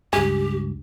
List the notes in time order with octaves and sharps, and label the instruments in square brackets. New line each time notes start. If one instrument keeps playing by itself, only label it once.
[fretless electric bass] C#2 G2 [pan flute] G4 [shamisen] G#4